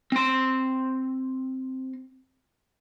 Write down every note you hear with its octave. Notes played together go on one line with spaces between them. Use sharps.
C4 C6